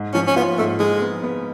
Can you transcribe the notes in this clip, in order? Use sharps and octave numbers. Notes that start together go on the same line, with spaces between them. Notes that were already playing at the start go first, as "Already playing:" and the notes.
Already playing: G#2
F3 C#4
C#4
B3 F4
G#2 A3
F3 G#3
B3
B3